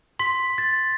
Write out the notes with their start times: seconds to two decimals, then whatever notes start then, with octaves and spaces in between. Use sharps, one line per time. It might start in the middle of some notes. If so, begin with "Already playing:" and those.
0.19 C6 B6
0.58 A6